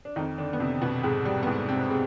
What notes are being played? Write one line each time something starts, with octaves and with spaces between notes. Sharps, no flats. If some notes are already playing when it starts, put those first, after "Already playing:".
D4
F2 D#3 D#4
D3 D4
B3
F2 C3 C4
B2 B3
F2 G#2 G#3
G3
B3
F2 G#2 G#3
C3 C4
C3 G#3